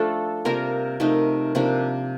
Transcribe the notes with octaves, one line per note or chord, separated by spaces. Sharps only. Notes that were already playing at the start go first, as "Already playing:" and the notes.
Already playing: F3 A3 D4 F4 A4
C3 G3 A#3 F4 A#4
C3 F3 A3 D#4
C3 F3 A#3 D4